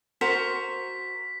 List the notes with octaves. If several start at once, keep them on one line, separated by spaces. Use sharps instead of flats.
F#4 A#4 C5 B6